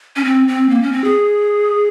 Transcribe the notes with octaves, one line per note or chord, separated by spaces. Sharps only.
C#4
C4
C4
A#3
C#4
C4
G#4